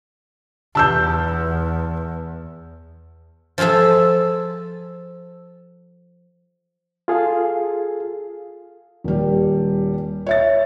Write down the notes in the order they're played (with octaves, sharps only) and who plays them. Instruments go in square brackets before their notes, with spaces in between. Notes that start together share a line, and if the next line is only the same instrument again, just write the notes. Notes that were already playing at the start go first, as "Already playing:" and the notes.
[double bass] E2 [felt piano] A5 E6 G6
[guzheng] F3 F4 G#4 A4 E5
[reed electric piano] F4 G#4 A4 F5
[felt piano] D#1 G3
C#5 E5 A6